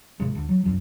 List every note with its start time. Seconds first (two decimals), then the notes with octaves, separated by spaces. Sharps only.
0.20 G#2 C3 G#3
0.35 D2
0.49 F#3
0.64 C2 F#2 F#3